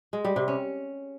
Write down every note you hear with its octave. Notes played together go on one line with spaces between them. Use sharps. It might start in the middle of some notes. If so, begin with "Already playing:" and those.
G#3
G3
C3
C#4